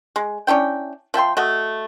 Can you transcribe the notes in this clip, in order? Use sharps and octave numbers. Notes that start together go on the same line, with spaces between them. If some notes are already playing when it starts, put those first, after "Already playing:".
G#3
C#4 D4 E4 G5
F3 E5 G5 C6
A3 F#4 D#5